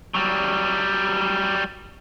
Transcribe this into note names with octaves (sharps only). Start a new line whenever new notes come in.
F#3 G3